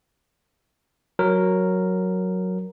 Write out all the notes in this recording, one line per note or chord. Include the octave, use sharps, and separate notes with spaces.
F#3 A#4